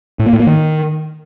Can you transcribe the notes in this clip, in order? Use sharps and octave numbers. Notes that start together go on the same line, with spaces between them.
A2
A#3
A2
A#3
D#3